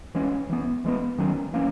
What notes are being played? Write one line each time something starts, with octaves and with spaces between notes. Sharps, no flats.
E3 G#3 C#4
E3 B3
E3 G#3 B3
D#3 F#3 C#4
E3 A#3 C#4